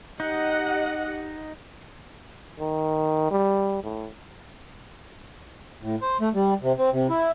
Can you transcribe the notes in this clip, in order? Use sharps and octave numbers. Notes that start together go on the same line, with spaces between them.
D#4 G4 D#5 F#5
D#3
G3
A2
A2
C5
A3
G3
C3
C4
C3
E4